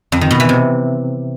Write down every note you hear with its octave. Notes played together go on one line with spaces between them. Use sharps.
F2
D#3
B2
E3
C3